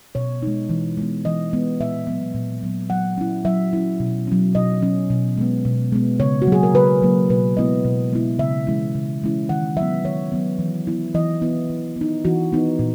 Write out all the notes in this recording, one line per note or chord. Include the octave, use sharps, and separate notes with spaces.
B2 C#5
G#3 D#4
E3
G#3 B3
E3 D#5
G#3 B3
A#2 E5
F#3 B3
A#2
F#3 B3
F#3 F#5
C#4 E4
F#3 E5
C#4 E4
B2
F#3 C#4
B2 D#5
F#3 C#4
B2
G#3 B3
B2
G#3 B3
C#3 C#5
F#4
F#3 A#3
G#4
A#4
C#3 B4
F#3 A#3
B2 B4
G#3 B3 E4 D#5
B2
G#3 B3 E4
C#3 E5
E3 G#3 C#4 E4
C#3
E3 G#3 C#4 E4
D#3 F#5
F#3 B3 E5
D#3 C#5
F#3 B3
E3
B3 E4
E3 D#5
B3 E4
E3
B3 D#4
E3 F#4
B3 D#4
A#2